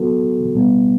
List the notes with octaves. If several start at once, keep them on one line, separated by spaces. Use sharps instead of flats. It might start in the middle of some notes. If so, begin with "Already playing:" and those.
Already playing: F#3 B3 F#4 A4
B2 G3 B3